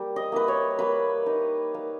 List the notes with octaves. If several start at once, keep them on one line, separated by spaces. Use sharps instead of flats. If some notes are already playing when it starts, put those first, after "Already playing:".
Already playing: G3 A#3
D#5
A#3 E4 B4
C#5
A#3 B4
D#4
A#3